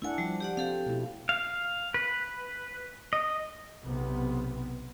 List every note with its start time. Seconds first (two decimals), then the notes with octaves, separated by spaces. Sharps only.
0.02 A3 D4 E4 F#5 G#5
0.18 F3 G3
0.40 G4 D5 F#5
0.57 C4 G4 A4 F5
0.86 B2 A3 E4
1.29 F5
1.94 B4
3.13 D#5
3.82 B1 C3 B3